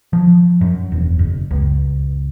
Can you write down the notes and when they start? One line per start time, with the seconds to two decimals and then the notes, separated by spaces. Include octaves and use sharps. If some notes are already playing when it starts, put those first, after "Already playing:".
0.13 F3
0.61 F#2
0.92 E1
1.19 F#1
1.51 C#2